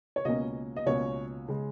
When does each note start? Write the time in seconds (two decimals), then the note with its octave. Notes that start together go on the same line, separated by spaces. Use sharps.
0.16 C#5
0.25 C#2 B2 A#3 C#4 D#5
0.77 D#5
0.86 C#2 B2 A#3 C#4 C#5
1.48 C#3 G#3